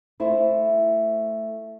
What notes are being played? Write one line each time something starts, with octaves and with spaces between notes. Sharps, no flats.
A3 E4 C5